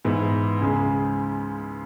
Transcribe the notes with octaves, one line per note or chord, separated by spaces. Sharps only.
G#2 E3 B3 E4
C#2 C#3 G#3